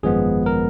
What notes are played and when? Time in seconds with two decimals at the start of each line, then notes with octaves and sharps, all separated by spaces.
0.03 G#1 F#2 F3 G#3 B3 G#4
0.46 A#4